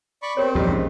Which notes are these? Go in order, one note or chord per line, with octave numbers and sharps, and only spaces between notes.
D5 B5 C#6
C4 G4 A#4 C#5
A#1 E2 G#2 G3 D#4
C#3